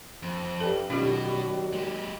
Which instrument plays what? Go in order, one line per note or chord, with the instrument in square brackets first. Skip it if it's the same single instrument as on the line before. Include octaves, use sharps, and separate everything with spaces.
[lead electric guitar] F2
[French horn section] G2 [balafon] A4
[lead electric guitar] B2 [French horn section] D#3 F#3 G3 [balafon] C#4 F4 G4
[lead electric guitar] G#3 G4